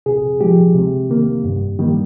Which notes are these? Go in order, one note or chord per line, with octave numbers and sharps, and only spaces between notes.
C3 G#4
F3 G#3 G4
C3
D#3 A#3
G2
D#3 G3 A#3